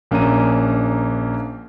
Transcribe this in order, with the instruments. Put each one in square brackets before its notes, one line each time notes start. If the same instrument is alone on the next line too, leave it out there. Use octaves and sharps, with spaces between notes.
[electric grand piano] A#1 A#3 C#4 D4 A#5 D#7